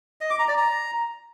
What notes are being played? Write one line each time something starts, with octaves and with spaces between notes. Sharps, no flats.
D#5
D6
A#5
D5
A#5